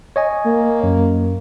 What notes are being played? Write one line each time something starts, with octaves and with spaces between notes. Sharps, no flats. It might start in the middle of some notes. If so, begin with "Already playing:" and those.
C#5 D#5 G#5
A#3
F#2